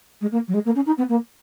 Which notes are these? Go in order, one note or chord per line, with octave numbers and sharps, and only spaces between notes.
G#3
A#3
F#3
G#3
A#3
C#4
D#4
B3
A#3